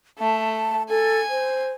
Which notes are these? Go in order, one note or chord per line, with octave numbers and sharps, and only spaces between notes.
A3 A5
A4 G#5
C5